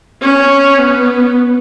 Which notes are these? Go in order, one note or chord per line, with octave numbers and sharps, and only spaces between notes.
C#4
B3